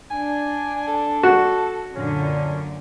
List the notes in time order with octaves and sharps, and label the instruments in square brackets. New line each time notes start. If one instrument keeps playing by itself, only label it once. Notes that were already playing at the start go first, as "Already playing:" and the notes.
[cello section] D4 [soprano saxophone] G#5
[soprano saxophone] A4
[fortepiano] F#4
[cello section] F#2 A#2 D3 [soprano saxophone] C#4